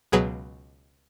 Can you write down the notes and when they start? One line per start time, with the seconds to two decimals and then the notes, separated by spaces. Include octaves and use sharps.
0.12 C#2 B2 F#3 G#4 B4